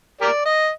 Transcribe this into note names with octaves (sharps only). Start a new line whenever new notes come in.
G4 A#4 D5
D#5